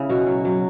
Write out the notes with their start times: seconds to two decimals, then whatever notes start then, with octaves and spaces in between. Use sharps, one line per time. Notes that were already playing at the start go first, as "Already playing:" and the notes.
Already playing: C#3 E4
0.09 B2 F#4
0.27 F#3
0.45 F#3